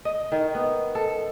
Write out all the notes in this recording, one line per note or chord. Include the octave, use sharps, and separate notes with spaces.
D#5
D#3
B3
A4